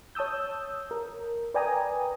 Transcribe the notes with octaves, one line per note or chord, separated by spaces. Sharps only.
C#5 A5 D#6 E6 G6
A#4
B4 D5 G5 G#5 A#5 D#6